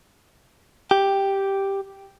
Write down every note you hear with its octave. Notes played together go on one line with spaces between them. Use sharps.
G4